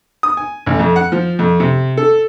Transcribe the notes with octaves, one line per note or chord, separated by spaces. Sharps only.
D#6
G#5
A1
F2
F#5
F3
F2
C3
A4